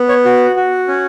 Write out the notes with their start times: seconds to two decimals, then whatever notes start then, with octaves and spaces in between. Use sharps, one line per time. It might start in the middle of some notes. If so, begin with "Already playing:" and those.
Already playing: B3
0.09 C#5
0.25 F#4
0.56 F#4
0.88 C#4